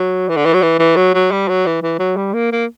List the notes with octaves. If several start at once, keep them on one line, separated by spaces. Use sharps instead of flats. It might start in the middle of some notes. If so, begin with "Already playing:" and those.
Already playing: F#3
E3
D3
E3
F#3
E3
E3
F#3
F#3
G3
F#3
E3
E3
F#3
G3
A#3
A#3